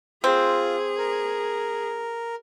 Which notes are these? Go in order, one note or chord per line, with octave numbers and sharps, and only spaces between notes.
C4 F4 G#4
A#4